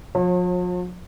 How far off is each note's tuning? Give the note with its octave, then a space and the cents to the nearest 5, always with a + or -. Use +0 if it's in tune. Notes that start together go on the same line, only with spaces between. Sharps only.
F3 +45 C#5 -40